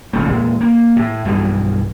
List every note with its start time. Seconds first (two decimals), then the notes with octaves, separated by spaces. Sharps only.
0.13 A1 C#3 F3 A3
0.27 E2 A#2 G#3
0.61 A#3
0.96 A2
1.25 B1 G2 B2 E3